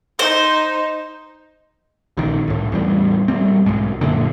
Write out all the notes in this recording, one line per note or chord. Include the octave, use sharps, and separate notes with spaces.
D#4 C5
A#1 D#3
C2 A2
E2 A2 G3
D#1 G3 C4
B1 G#2
F#1 F#2 A#2 D3